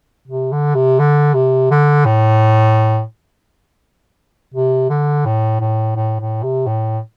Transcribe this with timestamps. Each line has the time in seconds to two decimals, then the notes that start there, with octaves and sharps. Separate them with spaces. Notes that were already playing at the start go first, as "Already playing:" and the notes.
0.28 C3
0.52 D3
0.75 C3
0.99 D3
1.34 C3
1.71 D3
2.05 A2
4.54 C3
4.90 D3
5.25 A2
5.60 A2
5.96 A2
6.20 A2
6.43 C3
6.67 A2